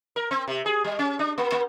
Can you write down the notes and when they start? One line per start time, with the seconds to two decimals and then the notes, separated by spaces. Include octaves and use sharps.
0.16 A#4
0.31 C4
0.48 C3
0.66 G#4
0.84 G3
0.99 C#4
1.19 D4
1.38 A#3
1.52 A#3